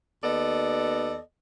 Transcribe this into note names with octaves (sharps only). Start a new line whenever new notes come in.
D#2 B3 A4 D5 D#5